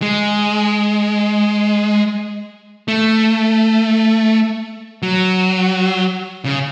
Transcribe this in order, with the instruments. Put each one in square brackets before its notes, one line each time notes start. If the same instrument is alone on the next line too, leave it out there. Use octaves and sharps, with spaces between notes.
[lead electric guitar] G#3
A3
F#3
C#3